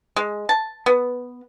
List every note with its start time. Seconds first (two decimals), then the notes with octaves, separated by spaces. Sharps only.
0.16 G#3
0.49 A5
0.86 B3